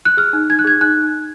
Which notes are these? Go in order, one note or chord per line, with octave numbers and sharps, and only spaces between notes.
F#6
G#4 F6
D#4
D#4 G#6
F#6
G#4 G#6
D#4 F#6